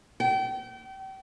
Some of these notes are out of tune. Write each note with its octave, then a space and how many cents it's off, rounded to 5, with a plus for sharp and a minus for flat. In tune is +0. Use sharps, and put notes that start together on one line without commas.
G5 -35